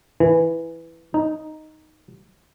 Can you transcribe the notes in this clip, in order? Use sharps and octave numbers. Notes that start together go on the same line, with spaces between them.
E3
D#4